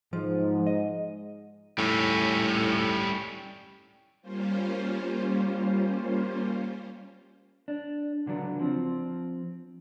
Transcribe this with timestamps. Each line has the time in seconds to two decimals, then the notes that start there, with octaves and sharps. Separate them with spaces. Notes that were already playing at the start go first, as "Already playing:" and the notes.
0.13 G#2 F3
0.67 D#5
1.78 A2 G3 C#4
4.22 G3 A#3 C#4 F4 C5
7.68 D4
8.26 C#2 D3 F#3 D4
8.59 F3 C4